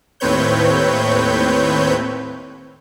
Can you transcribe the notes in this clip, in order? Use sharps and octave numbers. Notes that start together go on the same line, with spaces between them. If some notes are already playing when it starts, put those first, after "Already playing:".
D#2 A2 C4 B4 C#5 G6